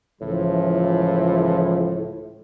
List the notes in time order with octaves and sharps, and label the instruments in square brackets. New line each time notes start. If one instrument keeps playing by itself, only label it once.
[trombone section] C#2 E3 F3 [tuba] A2